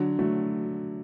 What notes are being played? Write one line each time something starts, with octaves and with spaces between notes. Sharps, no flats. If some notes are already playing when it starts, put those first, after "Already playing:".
Already playing: D3 F#3
F#3 A3